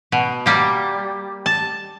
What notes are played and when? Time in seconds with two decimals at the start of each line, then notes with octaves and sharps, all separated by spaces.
0.12 B2
0.46 G3 A#3
1.46 A5